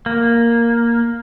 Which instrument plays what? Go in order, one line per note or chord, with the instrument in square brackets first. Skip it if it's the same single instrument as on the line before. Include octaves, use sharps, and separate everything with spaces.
[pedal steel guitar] A#3